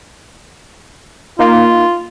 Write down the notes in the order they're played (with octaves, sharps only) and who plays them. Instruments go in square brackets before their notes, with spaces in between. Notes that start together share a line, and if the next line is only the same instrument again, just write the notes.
[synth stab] A#3 D#4 [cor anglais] F4